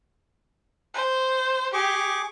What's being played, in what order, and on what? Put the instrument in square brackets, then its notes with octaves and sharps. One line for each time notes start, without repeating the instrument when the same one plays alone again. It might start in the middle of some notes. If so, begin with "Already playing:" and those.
[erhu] C5
[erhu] G4 [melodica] G#4 C#6 D6